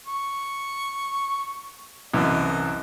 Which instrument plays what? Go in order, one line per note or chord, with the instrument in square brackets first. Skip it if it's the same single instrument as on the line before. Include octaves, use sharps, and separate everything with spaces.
[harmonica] C#6
[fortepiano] C2 F#2 E3 [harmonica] D#5